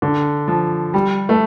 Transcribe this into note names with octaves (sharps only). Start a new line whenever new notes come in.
D3
F3
G3
A3